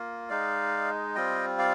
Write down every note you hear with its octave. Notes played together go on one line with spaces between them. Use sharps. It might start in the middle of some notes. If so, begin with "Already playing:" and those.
Already playing: A#3 F4
G#3 D#4 D5 F5
G3 C4 F4 D#5 G5
D5 F5